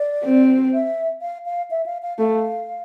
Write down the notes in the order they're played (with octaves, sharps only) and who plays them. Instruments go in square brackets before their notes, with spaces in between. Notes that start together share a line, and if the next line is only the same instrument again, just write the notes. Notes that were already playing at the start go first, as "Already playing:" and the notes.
Already playing: [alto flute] D5
[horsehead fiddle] C4
[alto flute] E5
F5
F5
E5
F5
F5
[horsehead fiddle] A3 [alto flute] F5